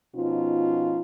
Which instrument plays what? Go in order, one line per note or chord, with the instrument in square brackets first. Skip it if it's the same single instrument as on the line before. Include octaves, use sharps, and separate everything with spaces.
[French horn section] B2 F3 C#4 D#4 F4